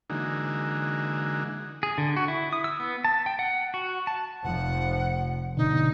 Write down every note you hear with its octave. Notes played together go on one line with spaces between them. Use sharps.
D3 E3 G#3 A#3 D#4 F#4
G#4
D3
F#4
E4
D#6
E6
B3
A5
G5
F#5
F#4
A5
F1 F3 F#5
G1 B2 D3 D#4